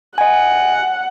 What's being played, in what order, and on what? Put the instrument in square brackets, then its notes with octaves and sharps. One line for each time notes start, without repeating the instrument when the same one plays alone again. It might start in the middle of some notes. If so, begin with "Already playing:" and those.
[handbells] D#5 G#5 [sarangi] F#5